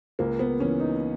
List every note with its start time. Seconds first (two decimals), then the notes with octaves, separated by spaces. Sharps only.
0.19 C#2 A#3
0.39 B3
0.59 C#3 E3 C#4
0.80 D#4